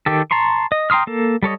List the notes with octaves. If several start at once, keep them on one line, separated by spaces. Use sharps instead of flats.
D#3 G4 A4
A5 A#5 C6 C#6
D#5
G5 A#5 C6 D#6 F6
A#3 A4
G3 A4 C#5 D#5